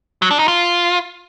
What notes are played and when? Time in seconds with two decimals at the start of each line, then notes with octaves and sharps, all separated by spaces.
0.22 F#3
0.31 D4
0.39 D#4
0.48 F4